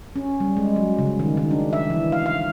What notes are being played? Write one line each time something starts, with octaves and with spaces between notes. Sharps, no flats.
C#4
G3
G#3
F#3
C#3
D#3
D#3
D4
E5
E3
F5
F5